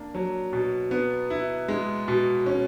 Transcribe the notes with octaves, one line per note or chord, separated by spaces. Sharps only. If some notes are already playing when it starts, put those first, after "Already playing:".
Already playing: A#3 D4
F#3
B2
B3
E4
G#3
B2
C#4